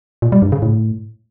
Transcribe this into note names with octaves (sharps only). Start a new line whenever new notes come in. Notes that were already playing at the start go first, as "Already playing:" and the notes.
A#2
G3
G2
C#3
A2